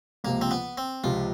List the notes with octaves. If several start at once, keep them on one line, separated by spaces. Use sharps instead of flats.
C#2 C3 F3 A#3
C4
B3
C4
C#2 C3 F3 F4